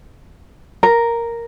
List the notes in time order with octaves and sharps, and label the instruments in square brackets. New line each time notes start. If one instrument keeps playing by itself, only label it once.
[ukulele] A#4